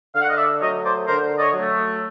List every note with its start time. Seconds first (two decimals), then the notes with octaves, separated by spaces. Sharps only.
0.15 D3 F5
0.22 F#5
0.29 D#5 F5
0.37 D5 E5
0.61 F#3 A3 C#5 D#5
0.84 C5 D5
1.07 D3 A#4 C5
1.35 D5
1.39 C#5 D#5
1.54 F#3
1.59 A3